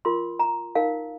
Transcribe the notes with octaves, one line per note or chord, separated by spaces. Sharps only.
F4 A#4 C6
A#5
D#4 A#4 F5